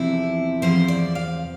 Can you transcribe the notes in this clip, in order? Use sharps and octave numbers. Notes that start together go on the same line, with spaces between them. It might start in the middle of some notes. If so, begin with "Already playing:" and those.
Already playing: E2 C3 F3 E4
E2 C3 F3 C5
D5
F5